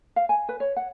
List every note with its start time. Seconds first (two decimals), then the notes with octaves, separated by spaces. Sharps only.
0.16 F5
0.29 G#5
0.49 B4
0.60 C#5
0.76 F#5